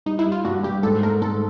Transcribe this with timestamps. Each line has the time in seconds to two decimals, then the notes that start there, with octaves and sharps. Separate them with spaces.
0.06 G3 D#4
0.19 E4
0.26 G3
0.32 F4
0.45 G2 F#4
0.63 G2 G4
0.83 G#2 A4
1.03 A3 A#4
1.22 G#2 A4